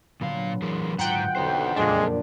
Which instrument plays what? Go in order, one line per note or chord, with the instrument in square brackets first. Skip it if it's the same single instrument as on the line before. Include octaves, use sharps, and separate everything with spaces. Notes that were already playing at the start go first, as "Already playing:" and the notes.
[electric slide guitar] A#2 F5 [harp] D3 F#3 B3
[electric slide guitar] E3 G#4 A#4
[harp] D#1 F4 [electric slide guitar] G#2 A#5 [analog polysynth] F#5 G5
[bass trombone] B1 [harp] D3 C4 [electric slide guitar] A4 C5
[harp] F#1 F2 [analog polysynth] A#2 D4 [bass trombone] G#3